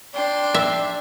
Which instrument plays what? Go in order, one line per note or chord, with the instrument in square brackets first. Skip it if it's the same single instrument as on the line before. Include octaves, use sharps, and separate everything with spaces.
[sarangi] D4 [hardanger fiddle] G5 C6
[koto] E5